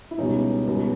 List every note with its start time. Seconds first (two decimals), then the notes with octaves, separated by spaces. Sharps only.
0.11 E4
0.18 C#2 B2 G3 C#4 D#4
0.67 C#2 B2 G3